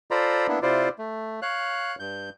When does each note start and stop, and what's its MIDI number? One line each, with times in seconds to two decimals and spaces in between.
0.11 0.47 65
0.11 0.47 69
0.11 0.47 72
0.11 0.47 74
0.11 0.47 82
0.11 0.47 83
0.48 0.59 58
0.48 0.59 59
0.48 0.59 62
0.48 0.59 64
0.62 0.89 48
0.62 0.89 64
0.62 0.89 65
0.62 0.89 72
0.62 0.89 74
0.98 1.40 57
1.42 1.96 73
1.42 1.96 77
1.42 1.96 90
2.00 2.30 43
2.00 2.30 91